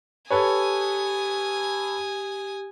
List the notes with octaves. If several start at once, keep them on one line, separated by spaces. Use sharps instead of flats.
G4 A4 B4 C#5 G#5 D#6